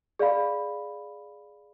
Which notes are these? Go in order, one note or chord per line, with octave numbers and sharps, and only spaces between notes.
G#4 D5 F5 B5